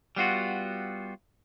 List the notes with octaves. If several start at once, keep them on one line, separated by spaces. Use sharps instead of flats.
G3 B3 F4 F#4